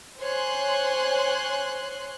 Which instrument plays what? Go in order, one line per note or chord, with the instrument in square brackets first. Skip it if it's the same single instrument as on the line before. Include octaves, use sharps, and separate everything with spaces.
[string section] C5 C#5 G#5 C6 F#6